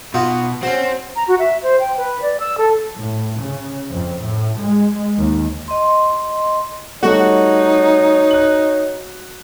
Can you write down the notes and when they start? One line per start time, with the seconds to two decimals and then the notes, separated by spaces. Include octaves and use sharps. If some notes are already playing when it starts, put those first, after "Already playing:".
0.14 B2 D#4 F4 F#4
0.63 C4 C#4 F#4
1.16 A#5
1.28 F#4
1.39 E5
1.63 C5
1.80 G5
1.97 B4
2.22 D5
2.40 E6
2.58 A4
2.98 A2
3.41 C#3
3.90 F2
4.22 A2
4.61 G#3
5.18 D#2
5.68 D#5 C6
7.03 G3 A3 D#4 F#4 C#5
8.31 F#6 F#7